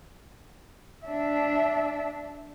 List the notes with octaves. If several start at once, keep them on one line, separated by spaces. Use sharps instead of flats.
D4 E5